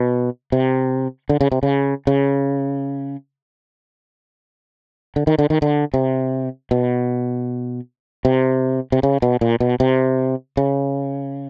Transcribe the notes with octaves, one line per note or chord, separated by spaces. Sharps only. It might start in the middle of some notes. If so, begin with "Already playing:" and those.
Already playing: B2
C3
D3
C#3
C3
C#3
C#3
D3
D#3
D3
D#3
D3
C3
B2
C3
C3
C#3
B2
A#2
B2
C3
C#3